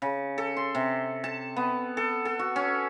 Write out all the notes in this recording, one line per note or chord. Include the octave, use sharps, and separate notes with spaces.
C#3
A4
C6
C3
A5
B3
A4
A4
F#4
C#4